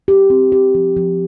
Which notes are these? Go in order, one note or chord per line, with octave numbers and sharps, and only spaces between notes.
G4
C4
G4
F3
F3